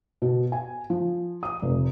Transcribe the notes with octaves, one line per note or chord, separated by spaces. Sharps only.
B2
G#5
F3
D#6
F1